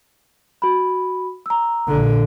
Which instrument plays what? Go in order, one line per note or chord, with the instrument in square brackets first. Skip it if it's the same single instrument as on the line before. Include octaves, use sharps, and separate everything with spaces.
[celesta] F#4 B5
A#5 E6
[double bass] A#1 D3